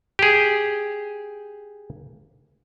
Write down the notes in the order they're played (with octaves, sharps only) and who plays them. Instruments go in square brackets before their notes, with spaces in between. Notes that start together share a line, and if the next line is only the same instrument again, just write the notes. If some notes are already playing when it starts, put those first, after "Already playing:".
[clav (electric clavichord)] G4 G#4